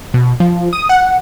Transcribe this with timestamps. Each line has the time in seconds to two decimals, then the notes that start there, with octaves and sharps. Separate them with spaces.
0.14 B2
0.40 F3
0.73 D#6
0.89 F#5